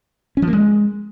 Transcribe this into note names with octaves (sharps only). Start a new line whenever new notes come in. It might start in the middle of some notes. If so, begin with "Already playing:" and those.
C#4
F3
A#3
G#3